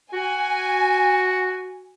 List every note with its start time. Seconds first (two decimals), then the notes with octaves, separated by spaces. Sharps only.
0.13 F#4 G#5